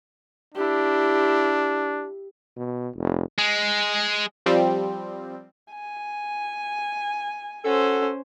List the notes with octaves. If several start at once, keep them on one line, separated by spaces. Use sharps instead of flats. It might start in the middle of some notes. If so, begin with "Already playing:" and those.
D4 E4 G4
B2
F1
G#3
F3 G3 C4
G#5
C#4 F#4 A4 C5